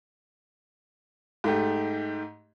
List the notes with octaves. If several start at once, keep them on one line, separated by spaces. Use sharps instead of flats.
G#2 A3 G4